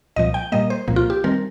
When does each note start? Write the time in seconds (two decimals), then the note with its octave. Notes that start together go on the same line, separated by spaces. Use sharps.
0.16 C2 A#2 F3 D#5
0.34 G5
0.52 A#2 G3 A#3 D#5
0.70 C5
0.88 C2 A#2 F3 A#3
0.96 F4
1.10 G4
1.24 D#3 G3 C4 A#4